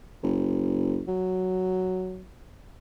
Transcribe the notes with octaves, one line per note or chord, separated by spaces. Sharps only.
F#1
F#3